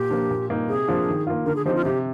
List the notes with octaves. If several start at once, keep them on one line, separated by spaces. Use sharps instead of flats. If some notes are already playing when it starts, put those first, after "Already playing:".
Already playing: A#2 G4
F3 A#3 D4
A#2
G3 A#3 D#4
C3 G#4
F3 A#3 D4 F4
D#3
A#3 F4
D3 A#4
G#4
F3 C4 D#4 G4
F4
C3 G4